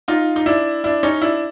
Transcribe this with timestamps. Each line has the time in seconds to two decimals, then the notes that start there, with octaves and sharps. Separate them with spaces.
0.08 D#4 F4
0.36 D#4
0.46 D4 E4
0.84 D4 E4
1.03 C#4 D#4
1.22 D4 E4